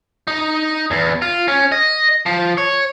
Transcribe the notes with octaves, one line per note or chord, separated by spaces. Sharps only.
D#4
E2
F4
C#4
D#5
F3
C#5